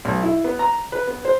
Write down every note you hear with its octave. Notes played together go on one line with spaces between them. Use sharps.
B1
E4
B3
A#5
B4
B3
C5